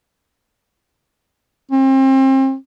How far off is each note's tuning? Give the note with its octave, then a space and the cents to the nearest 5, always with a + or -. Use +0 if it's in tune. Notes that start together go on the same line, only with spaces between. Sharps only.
C4 +35